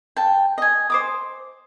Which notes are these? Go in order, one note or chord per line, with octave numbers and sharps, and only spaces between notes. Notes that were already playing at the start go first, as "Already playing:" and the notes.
G5 A5
D#5 G#5
C5 D6 D#6